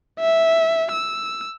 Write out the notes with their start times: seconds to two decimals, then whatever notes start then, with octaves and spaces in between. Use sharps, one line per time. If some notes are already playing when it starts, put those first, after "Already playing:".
0.20 E5
0.92 E6